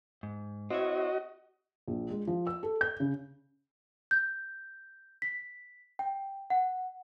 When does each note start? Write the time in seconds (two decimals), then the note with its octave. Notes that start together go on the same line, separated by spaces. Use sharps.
0.23 G#2
0.71 C4 E4 F#4 C#5 D#5
1.88 A#1
2.11 G#3
2.27 F3
2.47 E6
2.63 A4
2.81 G6
3.00 C#3
4.11 G6
5.22 B6
5.99 G5
6.50 F#5